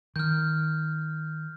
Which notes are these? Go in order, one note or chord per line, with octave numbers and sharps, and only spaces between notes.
D#3 F6 G6